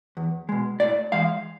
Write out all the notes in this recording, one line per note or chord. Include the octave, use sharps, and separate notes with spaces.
E2
B2 G#3
A2 D5
E3 G#3 F5